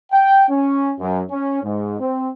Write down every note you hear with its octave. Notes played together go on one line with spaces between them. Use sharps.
G5
C#4
F#2
C#4
G#2
C4